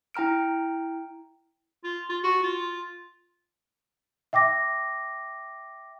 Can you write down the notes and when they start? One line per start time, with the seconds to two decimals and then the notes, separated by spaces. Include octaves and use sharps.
0.14 E4 G5 A#5 F6 D7
1.84 F4
2.09 F4
2.24 F#4
2.43 F4
4.33 E5 G5 D6 A#6